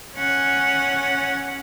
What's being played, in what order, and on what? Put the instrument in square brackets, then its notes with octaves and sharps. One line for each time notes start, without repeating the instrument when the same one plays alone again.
[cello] C#4 F#5